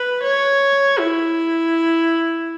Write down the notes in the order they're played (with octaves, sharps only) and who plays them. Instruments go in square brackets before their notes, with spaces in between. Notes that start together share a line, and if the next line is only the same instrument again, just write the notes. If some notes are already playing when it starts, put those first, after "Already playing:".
Already playing: [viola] B4
C#5
E4